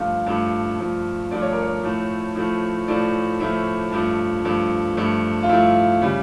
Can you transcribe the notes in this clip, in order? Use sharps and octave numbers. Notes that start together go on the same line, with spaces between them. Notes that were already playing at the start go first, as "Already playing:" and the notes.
Already playing: G2 F3 A3 F4
G2 F3 A3
G2 F3 A3
G2 F3 A3 D5
C#5
A#4
C#5
A2 F3 A3
A2 F3 A3
A2 F3 A3 D5
A2 F3 A3 E5
G2 F3 A3
G2 F3 A3
G2 F3 A3
F4
G2 F3 A3 E4
C#3 G3